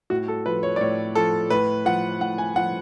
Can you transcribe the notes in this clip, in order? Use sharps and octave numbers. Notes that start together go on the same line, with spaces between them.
A2 F#4
A4
F3 B4
C#5
D5
A2 C#5
F3 A4
A2 B4
F3 F#5
A2 F#5
G#5
F3 F#5